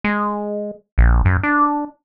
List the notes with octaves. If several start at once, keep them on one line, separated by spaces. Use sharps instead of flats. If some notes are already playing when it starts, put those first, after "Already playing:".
G#3
A#1
F#2
D4